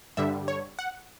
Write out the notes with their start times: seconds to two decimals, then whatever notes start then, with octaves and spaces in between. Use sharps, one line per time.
0.17 G2 D3 G3 E5
0.48 C#5
0.79 F#5